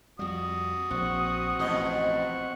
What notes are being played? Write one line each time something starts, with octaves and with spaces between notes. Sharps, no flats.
F2 G3 F#4 D#6
A#1 C4 F#5 C#6
A1 F2 B2 D#5